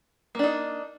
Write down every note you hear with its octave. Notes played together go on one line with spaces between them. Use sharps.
A#3 D4 D#4